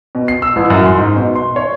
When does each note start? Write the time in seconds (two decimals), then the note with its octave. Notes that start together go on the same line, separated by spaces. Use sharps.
0.15 B2
0.28 C7
0.42 E6
0.56 A1
0.70 F#2
0.86 C6
0.98 G#2
1.16 B2
1.36 C6
1.56 C#5